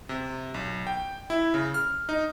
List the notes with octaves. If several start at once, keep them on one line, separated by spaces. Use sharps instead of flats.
C3
B1
G5
E4
C#3
F6
D#4